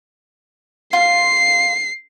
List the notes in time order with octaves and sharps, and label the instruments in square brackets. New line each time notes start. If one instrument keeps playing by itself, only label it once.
[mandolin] F4 [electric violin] C7